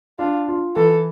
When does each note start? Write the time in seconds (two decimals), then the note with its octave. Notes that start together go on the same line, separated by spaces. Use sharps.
0.19 D4 F4
0.48 F4
0.76 E3 A4